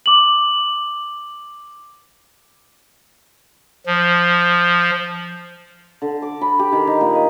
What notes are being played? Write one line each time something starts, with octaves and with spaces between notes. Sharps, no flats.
D6 F#7
F3
D3
D6
B5
G4
D#3
D#4
A#2
D#5